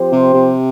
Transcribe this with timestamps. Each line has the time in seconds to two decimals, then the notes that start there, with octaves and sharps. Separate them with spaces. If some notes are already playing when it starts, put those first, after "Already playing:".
Already playing: F3 C4 G4 C5
0.12 C3
0.34 C3